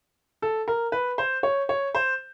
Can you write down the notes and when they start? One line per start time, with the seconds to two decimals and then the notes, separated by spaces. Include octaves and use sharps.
0.42 A4
0.68 A#4
0.92 B4
1.18 C5
1.43 C#5
1.69 C#5
1.95 C5